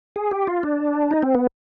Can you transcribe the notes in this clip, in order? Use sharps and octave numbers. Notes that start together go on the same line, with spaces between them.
G#4
G4
F4
D4
D#4
C4
B3